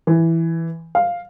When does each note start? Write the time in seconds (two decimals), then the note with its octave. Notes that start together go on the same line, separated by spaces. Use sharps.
0.07 E3
0.95 F5